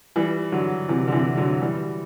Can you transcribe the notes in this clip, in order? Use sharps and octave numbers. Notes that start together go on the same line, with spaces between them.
E3 G3
D3 F#3
C3 E3
D3
C3 E3
D3 F#3
E3 G3